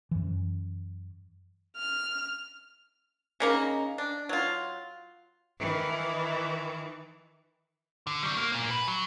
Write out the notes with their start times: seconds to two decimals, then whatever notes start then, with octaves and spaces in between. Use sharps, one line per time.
0.11 F#2 E3
1.76 F6
3.40 C#3 A#3 D#4
3.98 D4
4.29 F#3 F4
5.59 D#3 E3
8.07 D3
8.23 F#3 G3
8.37 A#3
8.52 A#2 A#3
8.71 B4
8.88 F#3